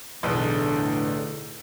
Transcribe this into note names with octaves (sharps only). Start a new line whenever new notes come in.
B1 E2 A2 D3